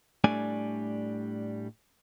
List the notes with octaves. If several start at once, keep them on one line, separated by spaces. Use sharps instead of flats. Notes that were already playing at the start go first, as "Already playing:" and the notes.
A2 G3 A3 D4 D5 G#5